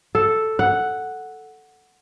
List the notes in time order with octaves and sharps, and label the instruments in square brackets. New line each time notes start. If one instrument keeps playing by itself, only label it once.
[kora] A4
F#5